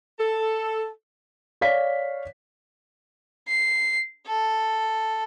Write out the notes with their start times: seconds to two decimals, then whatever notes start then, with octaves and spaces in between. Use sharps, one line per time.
0.19 A4
1.61 C#5 D5 F5 B6
3.49 C7
4.26 A4